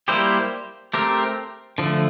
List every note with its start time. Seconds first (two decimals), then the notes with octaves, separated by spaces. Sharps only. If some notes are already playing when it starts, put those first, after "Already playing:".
0.08 G3 A#3 E4 G4 C5
0.93 A3 C4 G4 A#4
1.78 D3 F3 A3